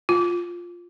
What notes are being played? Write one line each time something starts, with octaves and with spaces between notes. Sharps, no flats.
F4